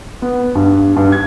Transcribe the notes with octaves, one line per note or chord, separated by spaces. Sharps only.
B3
G2
G2
G#6